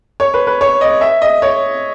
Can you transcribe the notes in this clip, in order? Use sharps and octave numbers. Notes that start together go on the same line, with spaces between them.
C#5
B4
B4
C#5
D#5
E5
D#5
C#5